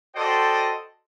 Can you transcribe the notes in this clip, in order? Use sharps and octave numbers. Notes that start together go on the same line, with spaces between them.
F#4 A4 C5 D5 D#5 G5